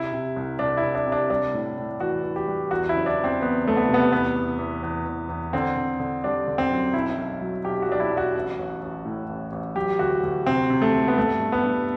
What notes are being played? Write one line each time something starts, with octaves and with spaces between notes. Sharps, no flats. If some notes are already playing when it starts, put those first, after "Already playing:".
Already playing: C3 E4
C3
C2
C2 D4
E4
C2
D4
C3
D4
G3 D4
A2
A2
E3 F#4
E3
G4
G3
E2 F#4
E4
F#1
D4
E2
C4
E2 B3
F#1 A3
B3
C3
B3
E2 B3
E2
E2
E2
E2
E2
D3 C4
D3
D3
G3 D4
D3
C4
F#2
B1 E4
B1
F#3
B1 G4
F#4
B1 D4
E4
B1
F#4
A1
A1
A1
A2
A1
A1
F#3 G4
D2 F#4
D2
C3 C4
C3
A3
D2
B3
G2 A3
G2
B3
G2